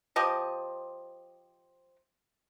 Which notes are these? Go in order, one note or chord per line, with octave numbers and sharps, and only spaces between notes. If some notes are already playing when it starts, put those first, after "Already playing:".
F3 G4 D#5